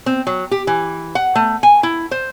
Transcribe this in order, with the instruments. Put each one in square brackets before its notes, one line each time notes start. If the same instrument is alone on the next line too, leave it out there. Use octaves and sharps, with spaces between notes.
[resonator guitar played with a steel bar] C4
F#3
G4
E3
F#5
A3
G#5
E4
C5